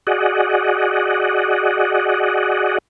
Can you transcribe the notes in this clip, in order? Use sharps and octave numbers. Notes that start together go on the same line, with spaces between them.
F#4 G#4 D5 D#5 F#5